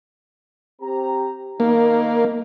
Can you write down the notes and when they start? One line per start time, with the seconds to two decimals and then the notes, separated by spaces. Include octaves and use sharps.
0.81 C4 G4 A#5
1.60 D#3 A#3 D#4 A#4